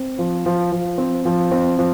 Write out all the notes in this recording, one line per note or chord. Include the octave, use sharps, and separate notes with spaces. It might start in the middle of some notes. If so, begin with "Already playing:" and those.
Already playing: C4
F3
F3
F3
C4
F3
C4
F3